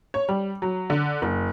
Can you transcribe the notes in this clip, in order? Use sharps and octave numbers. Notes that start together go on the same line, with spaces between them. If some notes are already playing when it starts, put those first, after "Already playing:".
C#5
G3
F#3
D3
F#1